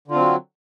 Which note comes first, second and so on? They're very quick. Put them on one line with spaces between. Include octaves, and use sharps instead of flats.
D3 F4 C4 F#3